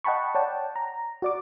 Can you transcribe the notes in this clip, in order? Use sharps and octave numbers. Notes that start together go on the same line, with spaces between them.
D#5 F#5 G5 A5 B5 C#6
C#5 D5 F#5 G5 A5
A#5
F#4 D5 D6